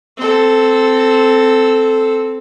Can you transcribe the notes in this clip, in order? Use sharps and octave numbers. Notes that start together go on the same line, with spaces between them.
C4 A4